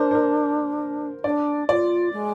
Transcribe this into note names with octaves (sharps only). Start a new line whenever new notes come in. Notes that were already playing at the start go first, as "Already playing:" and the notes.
Already playing: D4 A#4 C5
C5
A#4
D4 D5
F4 D5
G#3